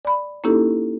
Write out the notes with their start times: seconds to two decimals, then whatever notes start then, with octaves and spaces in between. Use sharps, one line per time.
0.05 D5 B5
0.44 A#3 C#4 D#4 E4 G4 A4